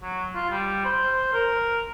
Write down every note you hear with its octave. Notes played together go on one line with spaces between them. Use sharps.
F#3
F4
G3
C5
A#4